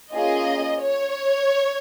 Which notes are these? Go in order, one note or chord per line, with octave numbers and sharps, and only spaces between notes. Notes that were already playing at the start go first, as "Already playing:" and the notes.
A#3 C#4 F4 G#4 D#5
C#5